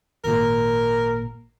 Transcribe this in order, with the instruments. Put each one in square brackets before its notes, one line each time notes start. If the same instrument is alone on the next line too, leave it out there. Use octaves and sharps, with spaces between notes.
[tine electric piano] G#1 A#2 A#3 [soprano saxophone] A#4